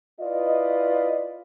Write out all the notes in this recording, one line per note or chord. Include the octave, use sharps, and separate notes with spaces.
E4 F4 B4 D5 D#5